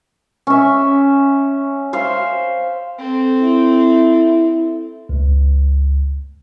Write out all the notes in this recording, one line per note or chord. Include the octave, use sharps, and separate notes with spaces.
C#4 E5
C5 E5 F5
C4 A4
E4
C#2